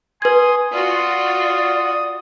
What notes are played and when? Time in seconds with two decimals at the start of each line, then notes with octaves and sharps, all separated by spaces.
0.22 B4 G#5 C6 D#6 G#6
0.72 F4 F#4 D5 D#6